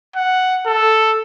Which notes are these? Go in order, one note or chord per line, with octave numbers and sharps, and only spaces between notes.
F#5
A4